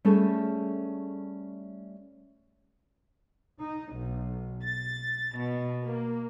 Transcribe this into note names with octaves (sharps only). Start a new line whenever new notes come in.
G3 A3 C#4 G#4 A4
D#4
B1
A6
B2
A#3